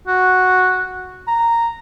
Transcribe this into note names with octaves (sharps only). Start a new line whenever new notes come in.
F#4
A#5